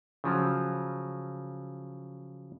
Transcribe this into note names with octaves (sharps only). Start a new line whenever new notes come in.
C#3 F3 F#3